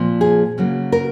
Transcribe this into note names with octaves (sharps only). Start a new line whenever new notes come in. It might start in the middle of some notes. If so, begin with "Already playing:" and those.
Already playing: A#2 F3 C4
G#4
C#3 F#3 A#3
A#4